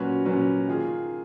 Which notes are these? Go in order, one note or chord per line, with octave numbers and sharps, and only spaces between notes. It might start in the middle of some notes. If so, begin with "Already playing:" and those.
Already playing: A#2 F#3 C#4 F#4 B4
A#2 F#3 C#4 F#4 B4
D#3 A#3 F4 G#4